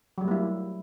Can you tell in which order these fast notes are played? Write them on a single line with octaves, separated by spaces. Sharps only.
F#3 G3 A3 A#3 E4